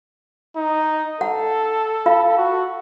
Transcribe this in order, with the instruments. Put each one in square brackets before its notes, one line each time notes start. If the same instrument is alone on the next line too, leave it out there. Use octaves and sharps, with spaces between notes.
[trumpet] D#4
[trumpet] A4 [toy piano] F#5
[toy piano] F4 F5 B5
[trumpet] F#4